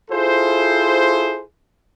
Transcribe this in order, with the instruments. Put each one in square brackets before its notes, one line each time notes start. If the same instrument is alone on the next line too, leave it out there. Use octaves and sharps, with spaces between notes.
[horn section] E4 F4 G#4 A4 C5